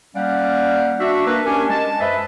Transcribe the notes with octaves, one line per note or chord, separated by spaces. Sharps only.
G3 A#3 C#4 D5 F5 F#5
D4 F#4 E5
A#3 D4 A#4 B4
C#4 D4 G4 A#4 G#5
G#3 A5
F#2 B4 C5 D#5 E5